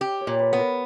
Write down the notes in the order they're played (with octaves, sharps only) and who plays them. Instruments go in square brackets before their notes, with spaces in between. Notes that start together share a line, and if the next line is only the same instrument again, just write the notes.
[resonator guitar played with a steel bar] G4 [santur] D#5
[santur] C#5
[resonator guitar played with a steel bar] A#2
[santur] B4
[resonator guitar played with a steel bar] B3
[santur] A#4